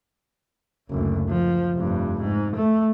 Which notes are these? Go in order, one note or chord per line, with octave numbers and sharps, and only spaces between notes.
F#1 D2
F3
F1 G2
G#2
A3